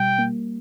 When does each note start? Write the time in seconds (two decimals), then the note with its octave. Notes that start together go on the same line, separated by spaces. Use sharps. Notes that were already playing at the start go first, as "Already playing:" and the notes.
Already playing: B2 G3 G5
0.19 A#3